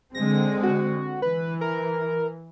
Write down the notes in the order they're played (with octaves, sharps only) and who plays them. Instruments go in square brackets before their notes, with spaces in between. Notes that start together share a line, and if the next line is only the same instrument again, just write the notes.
[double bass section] D3 G#3 C4 [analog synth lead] A#6
[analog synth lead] F#4
[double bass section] E3 [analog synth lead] B4
[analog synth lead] A#4